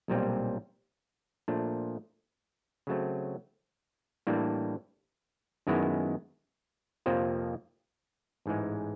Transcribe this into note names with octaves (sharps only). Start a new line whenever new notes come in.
B1 A#2 G3 C4 F4
A#2 F3 A3 D4
C#3 F#3 A3 C4
A2 E3 G3 A#3 D4
F#2 D#3 G#3 B3 E4
F2 C3 F3 A#3
A1 G#2 E3 G#3